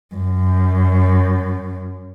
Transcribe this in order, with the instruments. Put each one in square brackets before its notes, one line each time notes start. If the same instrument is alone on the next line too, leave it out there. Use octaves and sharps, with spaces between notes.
[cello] F#2